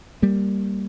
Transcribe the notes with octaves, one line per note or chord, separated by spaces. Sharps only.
G3 A#3